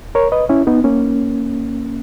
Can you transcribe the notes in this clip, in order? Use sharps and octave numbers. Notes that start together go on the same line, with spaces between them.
A#4 C#5
B4 D#5
C#4 E4
B3 D#4
A#3 C#4